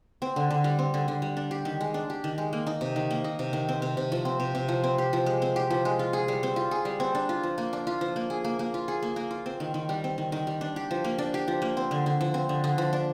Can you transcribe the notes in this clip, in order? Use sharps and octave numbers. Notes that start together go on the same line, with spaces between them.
C4
D3
D3
G3
C4
D3
D3
G3
D4
G4
D#3
G#3
D4
G4
D#3
G#3
A#3
D#4
C3
D#3
A#3
D#4
C3
D#3
C4
C3
C3
F3
C4
C3
C3
F3
C4
G4
F3
G#3
C4
G4
F3
G#3
F4
G#4
G3
C4
F4
G#4
G3
C4
D4
F4
F3
A#3
D4
F4
F3
A#3
G#4
A#3
A#3
F4
G#4
A#3
A#3
F4
C4
D#3
D#3
G3
C4
D#3
D#3
G3
D4
G4
F3
A#3
D4
G4
F3
A#3
C4
D3
D3
F3
C4
D3
D3
F3
D4